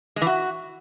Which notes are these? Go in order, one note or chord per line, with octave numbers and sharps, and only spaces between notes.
G#3
E3
F#4